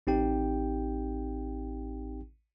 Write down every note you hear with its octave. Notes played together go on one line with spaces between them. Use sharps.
A1 C4 D#4 G4 G5